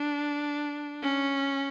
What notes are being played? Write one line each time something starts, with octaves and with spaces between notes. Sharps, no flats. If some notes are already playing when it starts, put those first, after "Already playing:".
Already playing: D4
C#4